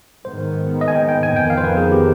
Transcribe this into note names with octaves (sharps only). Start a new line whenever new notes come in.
G#2 D#3 B3 C5
D#5
G#5
G5
G5
G#5
F2 D#3 B3 G5
F5
C5
B4
G#4
G4